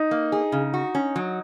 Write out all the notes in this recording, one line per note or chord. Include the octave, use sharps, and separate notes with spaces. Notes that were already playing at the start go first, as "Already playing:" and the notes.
Already playing: D#4
A#3
G#4
C#3
F#4
C#4
F#3